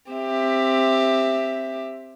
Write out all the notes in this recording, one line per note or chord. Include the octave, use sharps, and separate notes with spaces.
C4 G4 E5